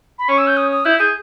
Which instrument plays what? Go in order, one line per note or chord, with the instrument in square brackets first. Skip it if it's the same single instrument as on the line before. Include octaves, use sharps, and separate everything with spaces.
[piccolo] B5
[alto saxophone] C#4 [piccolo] C#6
[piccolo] E6
G6
D#6
D#6
[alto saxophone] E4 [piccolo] G6
[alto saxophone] G#4 [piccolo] G6